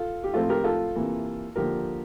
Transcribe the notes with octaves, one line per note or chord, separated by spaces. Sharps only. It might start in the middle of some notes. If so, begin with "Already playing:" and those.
Already playing: F4 A4
G4
A2 F3 C4 F4 A4
G4 A#4
F4 A4
C3 E3 A#3
D3 F3 A#3 G4 A#4